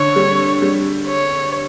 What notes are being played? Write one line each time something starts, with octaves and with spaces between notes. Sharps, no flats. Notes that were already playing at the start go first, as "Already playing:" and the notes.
Already playing: D3 C#5
G3
G3
C#5